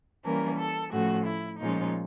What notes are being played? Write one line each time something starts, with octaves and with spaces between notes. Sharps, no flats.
E3 G3 A#3 C#4 A#4
A4
A2 F3 A3 C#4 F#4
E4
A#2 F3 G#3 C#4 D#4